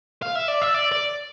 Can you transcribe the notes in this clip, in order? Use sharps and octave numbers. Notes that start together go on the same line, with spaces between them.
F5
E5
D5
E5
D5
D5